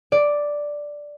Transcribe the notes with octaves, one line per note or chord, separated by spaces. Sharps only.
D5